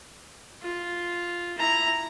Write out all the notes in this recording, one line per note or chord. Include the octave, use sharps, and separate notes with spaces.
F4
E4 A#5